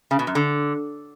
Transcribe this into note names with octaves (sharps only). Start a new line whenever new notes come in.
C#3
B2
F#2
D3